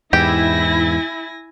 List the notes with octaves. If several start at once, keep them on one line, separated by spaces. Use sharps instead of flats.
E2 G#2 E4 G4 G#5 A#6